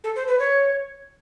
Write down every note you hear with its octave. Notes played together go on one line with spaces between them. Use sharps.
A4
C5
B4
C#5